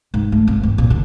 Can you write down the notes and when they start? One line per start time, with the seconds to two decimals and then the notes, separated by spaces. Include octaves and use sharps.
0.14 G#2
0.32 A3
0.47 G#1
0.63 E2
0.78 A#2
0.90 D3